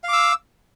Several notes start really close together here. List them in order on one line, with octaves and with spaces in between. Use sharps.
F5 D6 E6